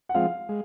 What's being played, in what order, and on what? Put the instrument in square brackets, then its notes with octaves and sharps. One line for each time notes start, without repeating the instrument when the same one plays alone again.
[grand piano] F#5
[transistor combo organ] F3 G#3 C4 F4 [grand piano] F5
[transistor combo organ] G#3